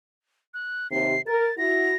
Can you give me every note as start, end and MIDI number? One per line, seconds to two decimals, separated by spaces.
0.54 0.90 90
0.91 1.14 39
0.91 1.14 48
0.91 1.21 96
1.27 1.48 70
1.27 1.57 93
1.58 1.94 64
1.58 1.94 66
1.58 1.97 94